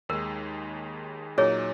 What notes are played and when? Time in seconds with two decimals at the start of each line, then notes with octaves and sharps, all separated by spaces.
0.09 D#2 D#3 G#3 A#4
1.38 A#2 F#3 D#4 G#4 C#5